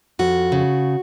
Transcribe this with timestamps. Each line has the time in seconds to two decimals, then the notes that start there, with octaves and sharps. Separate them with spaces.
0.19 F2 F#4
0.52 C#3